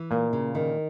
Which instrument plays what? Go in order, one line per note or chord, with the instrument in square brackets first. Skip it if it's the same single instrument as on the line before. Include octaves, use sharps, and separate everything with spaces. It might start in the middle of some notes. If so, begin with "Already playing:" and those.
Already playing: [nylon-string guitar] E3
[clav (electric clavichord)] A#2 [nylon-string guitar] A#3
[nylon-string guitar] C#3
D#3